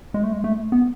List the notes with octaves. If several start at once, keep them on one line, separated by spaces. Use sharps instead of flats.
G#3
A3
G#3
A3
B3